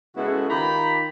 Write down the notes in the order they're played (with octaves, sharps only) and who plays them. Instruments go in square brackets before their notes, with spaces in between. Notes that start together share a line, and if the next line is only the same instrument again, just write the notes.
[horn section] C#3 G#3 B3 E4 F#4 A4
D#3 F4 G4 A#5 B5